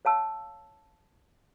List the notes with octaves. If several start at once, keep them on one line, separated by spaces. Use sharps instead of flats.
C#5 F5 A5 E6